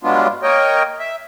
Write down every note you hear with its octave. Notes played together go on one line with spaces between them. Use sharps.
G2 F#3 G#3 B3 D4 F4
A#3 A#4 C#5 D#5 G5
E5